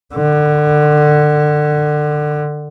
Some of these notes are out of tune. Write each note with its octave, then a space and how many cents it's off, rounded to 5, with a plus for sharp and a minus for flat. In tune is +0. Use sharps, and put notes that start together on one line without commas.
D3 +25